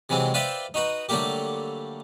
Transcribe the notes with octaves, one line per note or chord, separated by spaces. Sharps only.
C3 E3 F#3 G#3 C4
F4 B4 C5 D5 E5 G5
D#4 F#4 B4
D3 F#3 G3 A3 A#3 G4